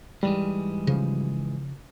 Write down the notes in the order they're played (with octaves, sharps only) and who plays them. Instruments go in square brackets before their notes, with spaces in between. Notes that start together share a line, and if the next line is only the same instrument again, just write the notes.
[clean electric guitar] G#2 E3 G#3 [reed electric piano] G3
[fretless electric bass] C#3 F3